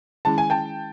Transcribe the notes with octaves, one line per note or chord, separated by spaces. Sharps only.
D#3 G#3 C#4 E4 G#4 A5
G#5
G5 A5